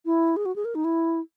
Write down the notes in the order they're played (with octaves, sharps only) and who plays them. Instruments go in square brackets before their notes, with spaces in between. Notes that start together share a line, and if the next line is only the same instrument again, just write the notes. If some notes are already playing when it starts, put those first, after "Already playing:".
[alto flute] E4
G#4
F#4
G#4
A#4
D#4
E4